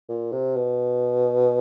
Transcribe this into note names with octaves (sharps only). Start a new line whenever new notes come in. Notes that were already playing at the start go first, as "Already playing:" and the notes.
A#2
C3
B2